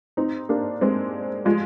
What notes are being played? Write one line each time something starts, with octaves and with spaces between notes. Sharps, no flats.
C4 D#4
A#3 D4
G#3 C4
F3 G#3